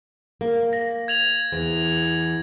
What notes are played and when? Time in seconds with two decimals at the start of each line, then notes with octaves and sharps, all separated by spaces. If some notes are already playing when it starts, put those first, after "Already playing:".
0.41 A#3
0.73 A#6
1.08 G#6 F7 F#7
1.52 E2